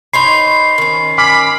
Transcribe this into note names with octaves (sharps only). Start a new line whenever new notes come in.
D#4 C5 C#5 B5 C6 C7
D#3 C#4
G#5 B5 D6 F6